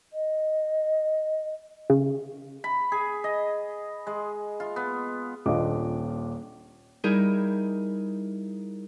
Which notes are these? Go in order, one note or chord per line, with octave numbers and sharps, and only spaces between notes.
D#5
C#3
B5
G#4
D#5
G#3
F4
B3
D#1 A#2 D4 F4 D#5 D6
G3 D#4 E4 G#4 A#4